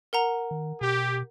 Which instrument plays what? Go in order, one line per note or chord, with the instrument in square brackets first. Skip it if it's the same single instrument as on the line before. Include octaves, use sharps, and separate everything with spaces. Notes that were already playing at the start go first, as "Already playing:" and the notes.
[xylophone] A#4 F#5 A#5
[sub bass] D#3
[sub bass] B2 [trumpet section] G4